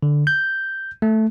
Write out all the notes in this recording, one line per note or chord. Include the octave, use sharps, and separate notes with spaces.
D3
G6
A3